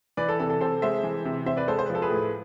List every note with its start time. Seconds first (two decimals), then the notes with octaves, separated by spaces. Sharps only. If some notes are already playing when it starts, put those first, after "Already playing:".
0.17 E3 B4 D5
0.29 A4
0.40 C3 A4
0.50 A4
0.61 C3 A4 C5
0.82 G#3 C5 E5
1.04 E3
1.25 C3
1.46 C3 C5 E5
1.57 B4 D5
1.68 G#3 A4 C5
1.79 C5
1.86 B4
1.90 F3
1.95 A4
2.02 G#4 B4
2.10 A2